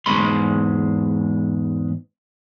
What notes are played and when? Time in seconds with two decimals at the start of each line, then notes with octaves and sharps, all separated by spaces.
0.06 E2 G#2 G#3 B5 C6